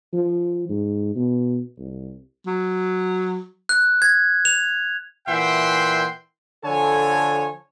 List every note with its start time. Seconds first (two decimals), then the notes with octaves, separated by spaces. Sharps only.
0.13 F3
0.69 G#2
1.16 B2
1.78 C2
2.47 F#3
3.69 F#6
4.02 G#6
4.45 F7
5.28 A#2 E3 E5 F#5 G5 C6
6.65 D3 F3 A4 C#5 G#5